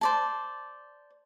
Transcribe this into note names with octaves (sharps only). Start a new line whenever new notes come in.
C5 D5 A5